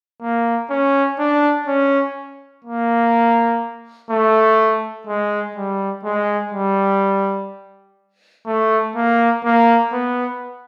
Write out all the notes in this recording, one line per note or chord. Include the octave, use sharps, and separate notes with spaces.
A#3
C#4
D4
C#4
A#3
A3
G#3
G3
G#3
G3
A3
A#3
A#3
B3